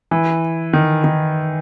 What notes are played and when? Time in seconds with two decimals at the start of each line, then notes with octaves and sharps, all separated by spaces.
0.11 E3
0.73 D#3
1.04 D#3